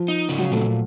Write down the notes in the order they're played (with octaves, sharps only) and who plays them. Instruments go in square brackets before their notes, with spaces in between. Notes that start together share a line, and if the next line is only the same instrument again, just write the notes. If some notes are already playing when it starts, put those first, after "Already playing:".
Already playing: [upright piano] F3
[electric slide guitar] D#4
C#3
[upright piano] F#3
[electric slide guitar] A#2 [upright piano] A3